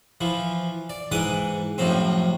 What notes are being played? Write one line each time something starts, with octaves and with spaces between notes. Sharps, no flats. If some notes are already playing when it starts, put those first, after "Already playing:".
E3 F3
D5
G#2 E3 F#5 D6 D#6
F#2 A2 C3 F3 C4